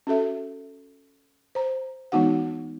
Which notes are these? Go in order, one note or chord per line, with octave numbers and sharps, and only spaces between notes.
C#4 F#4 A4 E5
C5 A#5
E3 G#3 B3 D#4 F#4 F#5